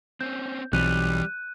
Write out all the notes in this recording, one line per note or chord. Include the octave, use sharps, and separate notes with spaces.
C4 C#4 G6
B1 E3 G3 C4 F#6 D#7